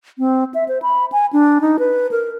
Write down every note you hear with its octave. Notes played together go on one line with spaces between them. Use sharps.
C4
E5
C5
B5
G#5
D4
D#4
B4
A#4